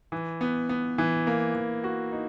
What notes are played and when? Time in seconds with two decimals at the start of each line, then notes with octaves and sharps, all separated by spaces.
0.12 E3
0.41 B3
0.69 B3
0.98 E3
1.27 A#3
1.55 E3
1.84 F#4
2.12 D#4